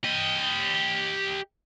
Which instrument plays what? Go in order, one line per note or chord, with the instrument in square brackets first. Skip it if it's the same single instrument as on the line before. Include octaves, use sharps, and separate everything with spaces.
[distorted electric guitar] G4 D#5